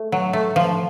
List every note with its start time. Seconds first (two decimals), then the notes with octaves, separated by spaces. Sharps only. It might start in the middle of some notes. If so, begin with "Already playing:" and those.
Already playing: A3
0.12 F#3
0.33 A3
0.56 F3